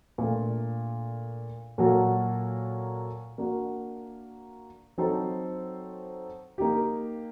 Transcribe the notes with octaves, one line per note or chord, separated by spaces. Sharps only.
A#2 A3 D4
A#2 F#3 A#3 F#4 A4
A#3 D4 F#4
F#3 C4 D#4 A4 C5
A#3 D#4 G4